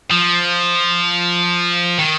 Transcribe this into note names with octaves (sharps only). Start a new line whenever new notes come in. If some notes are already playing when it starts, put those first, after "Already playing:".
F3
D#3